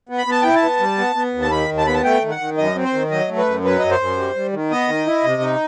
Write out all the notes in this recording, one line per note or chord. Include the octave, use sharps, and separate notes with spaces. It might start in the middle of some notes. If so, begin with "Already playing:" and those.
B3
B5
B3 A5
E4 G5
A5
B3
G3
B3
B3
D#2
A5
D#3 B5
D#2
A5
B3 B5
A5
A3 G5
D#3
F#5
D#3
F#2 D#5
C4
C5
D#3
F#3 D#5
A3
B4
F#2
F#3 B4
F#2 D#5
C5
F#2
G3
G3
D#3
B3 D#5
D#3
E4
C3
D#4